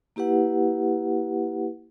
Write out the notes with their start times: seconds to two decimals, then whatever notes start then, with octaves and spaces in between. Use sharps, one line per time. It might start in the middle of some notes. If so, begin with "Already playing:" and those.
0.16 A#3 E4 G4 B4 F#5